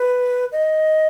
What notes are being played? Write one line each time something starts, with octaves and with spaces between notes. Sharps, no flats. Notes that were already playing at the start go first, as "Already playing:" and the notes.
Already playing: B4
D#5